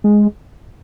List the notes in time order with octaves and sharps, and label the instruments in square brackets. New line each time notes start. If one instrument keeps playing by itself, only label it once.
[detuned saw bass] G#3